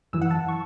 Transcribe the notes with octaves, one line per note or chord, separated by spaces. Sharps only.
F#2 E3 E6
F#5
A5
C#6